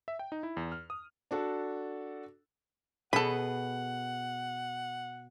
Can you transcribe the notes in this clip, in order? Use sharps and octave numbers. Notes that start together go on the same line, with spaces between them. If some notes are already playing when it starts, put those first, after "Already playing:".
E5
G5
D#4
E4
E2
F6
D#6
D4 F#4 A4
B2 G#4 A4 B4 F#5 B5